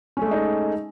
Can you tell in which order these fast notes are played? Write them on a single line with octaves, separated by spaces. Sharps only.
C#4 A3 G#3 D#4